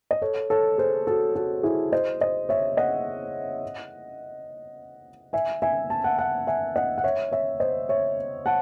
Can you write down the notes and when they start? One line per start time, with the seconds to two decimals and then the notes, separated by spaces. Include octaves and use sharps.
0.11 D#5
0.22 A4 C#5
0.50 A4 C#5
0.78 G#4 C5
1.07 F#4 A4
1.35 F#4 A4
1.63 E4 G#4
1.92 C5 D#5
2.21 C5 D#5
2.49 C#5 E5
2.77 D#5 F#5
5.33 E5 G#5
5.62 E5 G#5
5.90 A5
6.04 F#5 A5
6.18 F#5 A5
6.47 E5 G#5
6.76 D#5 F#5
6.98 F#5
7.04 C#5 E5
7.32 C#5 E5
7.60 C5 D#5
7.89 C#5 E5
8.46 F#5 A5